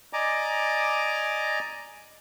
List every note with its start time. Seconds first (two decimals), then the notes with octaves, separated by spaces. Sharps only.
0.13 D5 D#5 G#5 A#5 D6